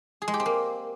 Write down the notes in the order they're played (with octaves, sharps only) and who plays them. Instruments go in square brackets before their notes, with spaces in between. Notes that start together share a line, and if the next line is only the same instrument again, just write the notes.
[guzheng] G#4
G#3
G4
C4
A#3